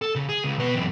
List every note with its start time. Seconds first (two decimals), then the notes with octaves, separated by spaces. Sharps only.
0.02 A4
0.15 C#3
0.29 G#4
0.44 C#2
0.59 B2 B4
0.75 F#2 E3